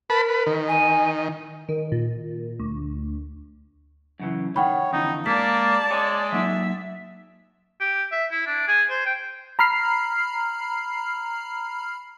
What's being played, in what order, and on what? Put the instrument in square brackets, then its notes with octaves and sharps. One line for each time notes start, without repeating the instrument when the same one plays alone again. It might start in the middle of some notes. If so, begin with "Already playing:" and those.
[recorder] A#4 [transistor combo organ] B4 A5 B5
[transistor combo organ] B4
D#3
[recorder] G#5
[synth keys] D#3
A#2
D2
[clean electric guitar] F#2 C#3 E3
[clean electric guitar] D#3 [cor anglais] C#5 [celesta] F#5 G5 B5
[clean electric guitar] F2 D3 E3 [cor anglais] D#4
[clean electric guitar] G#3 [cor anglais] A#3 [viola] D5 A5 [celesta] B6
[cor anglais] G#3 [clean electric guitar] C#5 G#5
[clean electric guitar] F#3 A#3 D#4 [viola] E5
[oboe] G4
E5
E4
D4
G#4
C5
G5
[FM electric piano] A#5 B5 F6 C7